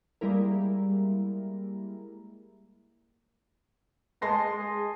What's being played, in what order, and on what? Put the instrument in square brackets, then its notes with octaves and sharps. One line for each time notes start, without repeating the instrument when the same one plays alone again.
[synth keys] G3 G#3 A#3 E4 A#4
[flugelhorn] G#3 [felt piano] A5 C6 A#6
[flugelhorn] G#4